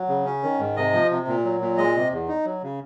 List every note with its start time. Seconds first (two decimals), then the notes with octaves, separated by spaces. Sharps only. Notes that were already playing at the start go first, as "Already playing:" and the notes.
Already playing: F#3
0.09 C#3
0.25 C#4
0.43 D#3
0.59 G#2
0.77 C3 D#5
0.93 F3
1.11 C3
1.27 A#2
1.45 F#3
1.61 A#2
1.78 G#3 D#5
1.95 C3
2.12 E2
2.28 D#4
2.45 F#3
2.63 C#3